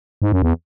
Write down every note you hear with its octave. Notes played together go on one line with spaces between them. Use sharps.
G#2
F#2
E2